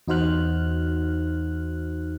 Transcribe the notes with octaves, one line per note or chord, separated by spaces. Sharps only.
E2 D#4 F#4 C5 F6 F#6